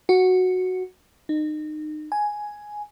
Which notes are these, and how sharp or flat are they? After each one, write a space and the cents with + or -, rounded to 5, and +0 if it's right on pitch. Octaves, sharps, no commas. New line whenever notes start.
F#4 -5
D#4 -30
G#5 +5